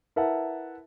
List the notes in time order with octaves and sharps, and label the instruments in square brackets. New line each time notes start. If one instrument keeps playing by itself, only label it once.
[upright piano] E4 A#4 B4 E5 F#5 A5